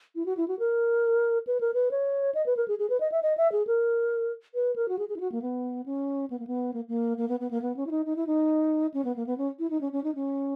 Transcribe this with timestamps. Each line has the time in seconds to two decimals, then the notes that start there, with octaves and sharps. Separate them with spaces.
0.16 E4
0.26 F#4
0.37 E4
0.48 F#4
0.59 A#4
1.47 B4
1.61 A#4
1.74 B4
1.91 C#5
2.35 D#5
2.46 B4
2.57 A#4
2.68 G#4
2.79 G#4
2.90 B4
3.00 D#5
3.12 E5
3.23 D#5
3.38 E5
3.52 G#4
3.67 A#4
4.54 B4
4.76 A#4
4.88 F#4
4.99 G#4
5.09 G#4
5.16 E4
5.20 F#4
5.32 A#3
5.42 B3
5.86 C#4
6.30 B3
6.39 A#3
6.47 B3
6.74 A#3
6.88 A#3
7.18 A#3
7.29 B3
7.40 B3
7.51 A#3
7.62 B3
7.77 C#4
7.87 E4
7.91 D#4
8.06 D#4
8.16 E4
8.27 D#4
8.94 C#4
9.05 B3
9.16 A#3
9.27 B3
9.38 C#4
9.59 E4
9.70 D#4
9.81 C#4
9.92 C#4
10.04 D#4
10.15 C#4